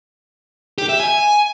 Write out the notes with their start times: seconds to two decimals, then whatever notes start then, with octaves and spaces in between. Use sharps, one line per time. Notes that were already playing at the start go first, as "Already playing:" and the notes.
0.78 G4
0.89 E5
1.00 G#5